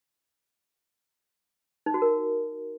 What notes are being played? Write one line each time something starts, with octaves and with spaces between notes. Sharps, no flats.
D#4
F#4
A#4